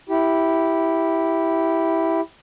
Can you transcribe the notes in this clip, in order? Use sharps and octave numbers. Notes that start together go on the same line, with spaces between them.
E4 G4